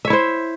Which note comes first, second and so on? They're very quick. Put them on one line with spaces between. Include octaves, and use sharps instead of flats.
E5 C#5 E4 C5